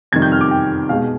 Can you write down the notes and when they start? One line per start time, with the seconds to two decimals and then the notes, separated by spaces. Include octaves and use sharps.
0.12 F2 C3 D#3 G3 G#6
0.22 G6
0.32 F6
0.41 D6
0.51 G5
0.89 B2 G#3 F5